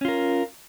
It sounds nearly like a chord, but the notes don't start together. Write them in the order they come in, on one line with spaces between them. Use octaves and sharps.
C#4 F4 A#4